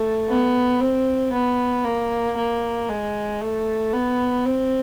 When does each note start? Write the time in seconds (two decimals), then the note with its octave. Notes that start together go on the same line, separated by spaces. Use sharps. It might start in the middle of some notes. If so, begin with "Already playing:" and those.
Already playing: A3
0.29 B3
0.81 C4
1.32 B3
1.85 A#3
2.37 A#3
2.89 G#3
3.41 A3
3.93 B3
4.46 C4